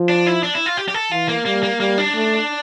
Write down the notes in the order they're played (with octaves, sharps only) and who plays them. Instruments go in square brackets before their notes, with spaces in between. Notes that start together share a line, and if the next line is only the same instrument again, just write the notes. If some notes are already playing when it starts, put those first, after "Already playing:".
Already playing: [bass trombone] F3
[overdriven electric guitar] D4
E4
D4
E4
F4
G4
G4
A4
[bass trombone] E3 [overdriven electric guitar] F4
[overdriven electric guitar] A#3
[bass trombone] G3 [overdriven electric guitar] A#3
[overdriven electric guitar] A#3
[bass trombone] G3 [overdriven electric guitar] A#3
[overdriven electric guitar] D4
[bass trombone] A3